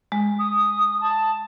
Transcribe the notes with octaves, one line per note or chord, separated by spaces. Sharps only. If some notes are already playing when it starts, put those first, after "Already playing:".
G#3
D#6
A5